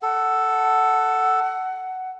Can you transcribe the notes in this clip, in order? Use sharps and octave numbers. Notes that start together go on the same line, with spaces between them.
A4 F#5